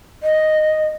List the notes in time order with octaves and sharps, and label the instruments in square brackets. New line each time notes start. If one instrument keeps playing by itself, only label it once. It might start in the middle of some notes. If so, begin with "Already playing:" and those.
[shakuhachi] D#5